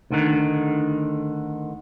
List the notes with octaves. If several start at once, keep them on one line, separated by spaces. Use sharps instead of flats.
D2 D3 D#3